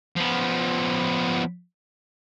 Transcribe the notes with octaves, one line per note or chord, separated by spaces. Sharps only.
F3 B3